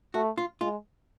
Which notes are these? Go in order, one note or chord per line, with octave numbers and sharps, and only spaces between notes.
A3 F#4
F4
G#3 F4